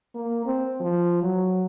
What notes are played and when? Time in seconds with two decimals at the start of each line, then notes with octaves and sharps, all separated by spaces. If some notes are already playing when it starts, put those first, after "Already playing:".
0.15 A#3
0.46 C4
0.80 F3
1.22 F#3